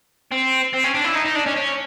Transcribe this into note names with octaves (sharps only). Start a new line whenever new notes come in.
C4
C4
C#4
D4
E4
D#4
D#4
D4
C#4
C#4